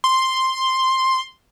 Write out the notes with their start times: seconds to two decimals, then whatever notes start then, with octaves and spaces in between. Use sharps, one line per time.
0.04 C6